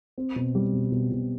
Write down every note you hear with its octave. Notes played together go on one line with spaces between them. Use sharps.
C4
B2
G3
B2
B2
B2